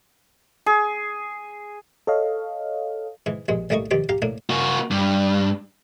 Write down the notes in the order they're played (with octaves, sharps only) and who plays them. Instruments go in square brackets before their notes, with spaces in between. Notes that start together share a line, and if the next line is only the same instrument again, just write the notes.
[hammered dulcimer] G#4
[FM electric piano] A4 C#5 D#5 F5
[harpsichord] G#2 E3
A#1 G2 G#3
A1 G3 A3 A#3 D#5 C#6
G2 D#3 F3 G4 D6
G4 F5 A#5
A2 A#3 D4
[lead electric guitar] A#3 F#4
G2